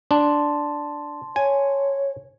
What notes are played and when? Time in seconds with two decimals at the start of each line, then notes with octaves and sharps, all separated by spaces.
0.11 D4 A5 C6
1.36 C#5 G#5